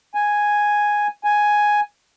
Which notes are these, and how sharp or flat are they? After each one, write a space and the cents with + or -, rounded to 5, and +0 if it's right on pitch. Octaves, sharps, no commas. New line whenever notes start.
G#5 +0
G#5 +5